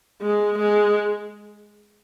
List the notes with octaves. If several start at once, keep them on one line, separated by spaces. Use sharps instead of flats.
G#3
G#3